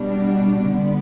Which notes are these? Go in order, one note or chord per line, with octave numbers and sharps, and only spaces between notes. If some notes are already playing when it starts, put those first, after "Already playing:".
Already playing: B2 G3 D4
D3 B3